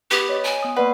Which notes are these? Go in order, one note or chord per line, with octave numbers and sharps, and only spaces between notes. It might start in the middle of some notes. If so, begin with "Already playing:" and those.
B3 G4
C#5 D#5
G#5
B3 D#6
A#3 B4 D5 F#5